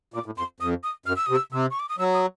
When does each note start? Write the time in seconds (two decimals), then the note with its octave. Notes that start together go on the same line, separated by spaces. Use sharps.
0.14 A#2 D6
0.26 A2
0.38 F2 C6
0.60 F2 D#6
0.83 D#6
1.06 F#2 F6
1.16 E6
1.26 C3 D#6
1.36 E6
1.52 C3 E6
1.70 C#6
1.80 D6
1.89 D#6
1.99 F#3 E6
2.14 D#6